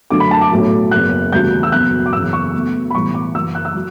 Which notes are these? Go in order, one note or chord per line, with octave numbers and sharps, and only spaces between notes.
F#2 D3 A3 D6
B5
A5
D6
B1 A2 F#3 A3
F#1 E2 C#3 F#6
E1 D2 C#3 G3 G6
E6
F#1 E2 B2 F#6
D6
F#1 E2 C#3 E3 E6
C#6
B1 B2 A3
B5
B1 A2 E3 G3 C#6
D6
F#1 F#2 E3 E6
F#6
E6
F#3